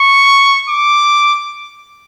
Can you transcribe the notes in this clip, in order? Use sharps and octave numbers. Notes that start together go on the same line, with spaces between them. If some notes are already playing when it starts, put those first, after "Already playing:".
Already playing: C#6
D6